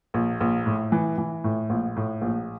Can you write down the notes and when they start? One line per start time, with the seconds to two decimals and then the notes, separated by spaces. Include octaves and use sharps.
0.14 A#1
0.40 A#1
0.66 A2
0.92 E3
1.18 E3
1.44 A2
1.69 A#1
1.96 A2
2.21 A#1